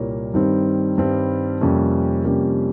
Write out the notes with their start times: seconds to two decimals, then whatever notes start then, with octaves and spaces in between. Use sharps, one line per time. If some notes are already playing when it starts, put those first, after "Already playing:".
Already playing: C2 A#2 G3 A#3 A#4 C#5
0.34 G2 D#3 G3 C4
0.98 G2 D#3 G3 C4
1.61 F2 C3 G3 A#3 C#4
2.24 F2 C3 G3 A#3 C#4 G4 A#4